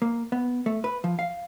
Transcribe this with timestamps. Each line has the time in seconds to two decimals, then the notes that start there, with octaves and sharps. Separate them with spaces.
0.02 A#3
0.32 B3
0.66 A3
0.84 B4
1.04 F3
1.19 F5